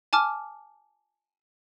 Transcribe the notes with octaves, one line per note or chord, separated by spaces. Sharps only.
G#5 A5 D6 F6